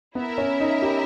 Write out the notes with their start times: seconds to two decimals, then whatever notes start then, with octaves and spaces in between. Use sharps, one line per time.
0.15 B3 E4
0.18 A#4 E5
0.38 C#4
0.60 D#4
0.82 G4